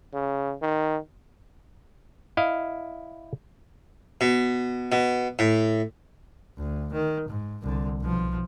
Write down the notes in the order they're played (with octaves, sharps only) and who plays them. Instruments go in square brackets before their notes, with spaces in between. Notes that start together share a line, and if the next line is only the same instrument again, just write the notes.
[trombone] C#3
D#3
[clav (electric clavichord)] E4 D#5 F5
[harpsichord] B2
B2
A2
[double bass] D2
D#3
G#2
C2 D3
B1 F3